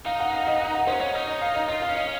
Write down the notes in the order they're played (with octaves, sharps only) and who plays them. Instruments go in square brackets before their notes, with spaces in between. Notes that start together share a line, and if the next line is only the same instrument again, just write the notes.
[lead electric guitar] D#4 [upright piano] F5
[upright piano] F#5
F5
D#5
F#5
F#5
[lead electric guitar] C#4 [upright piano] C5
[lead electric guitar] C#4 [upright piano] C#5
[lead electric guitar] D#4 [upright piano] D#5
[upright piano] D#5
F5
D#5
[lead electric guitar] F4 [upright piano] D#5
[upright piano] F5
[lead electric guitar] C#4
[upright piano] D#5